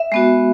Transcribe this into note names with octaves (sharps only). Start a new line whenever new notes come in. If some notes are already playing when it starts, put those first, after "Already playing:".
Already playing: E5
G#3 B3 F#4